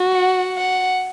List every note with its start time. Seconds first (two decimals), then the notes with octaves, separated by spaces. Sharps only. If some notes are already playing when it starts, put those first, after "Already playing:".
Already playing: F#4
0.12 F#5
0.57 F#5